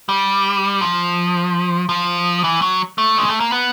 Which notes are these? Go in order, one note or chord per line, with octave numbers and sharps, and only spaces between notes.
G3
F3
F3
E3
F#3
A3
G#3
A3
A#3
B3